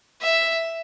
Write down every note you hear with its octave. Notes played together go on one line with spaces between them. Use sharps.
E5